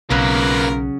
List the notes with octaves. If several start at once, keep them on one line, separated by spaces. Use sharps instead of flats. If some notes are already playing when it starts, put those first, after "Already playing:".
B1 C#3 F#3 A#3 F4 A#4 B4